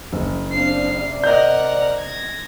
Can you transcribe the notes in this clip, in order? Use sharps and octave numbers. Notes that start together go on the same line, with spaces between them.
F#1
C4 D4 F5 C7
C3 D5
A#4 D#5 F#5 G6
G#6 A#6